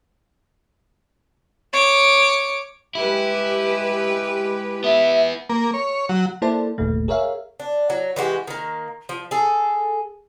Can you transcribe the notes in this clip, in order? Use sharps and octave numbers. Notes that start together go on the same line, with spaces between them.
C#5 D6
G#3 E4 G4 B4
B3 E4 E5
A#3
C#5
F#3
A#3 E4 A4 C5 D5 A5
G1 D#2 A#2 A3
G#4 A#4 C#5 E5 F5
D4
F#3
E3 G#3 F#4 G4
D#3 A#3
F3
G#4 A4